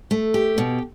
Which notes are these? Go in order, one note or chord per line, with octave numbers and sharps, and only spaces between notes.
A3
G4
B2